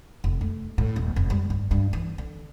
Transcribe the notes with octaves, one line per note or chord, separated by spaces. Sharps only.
F1
A3
A2
D#1
F1
G3
G2
G2
E3
D3